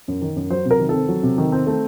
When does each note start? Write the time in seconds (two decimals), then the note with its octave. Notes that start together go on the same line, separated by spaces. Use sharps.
0.08 F#2
0.22 D#3
0.36 F#2
0.50 F#3 C5
0.65 C3
0.71 A#4
0.80 D#3
0.89 C4 A4
1.08 F#3
1.23 C3
1.38 D#3
1.52 C4
1.67 A3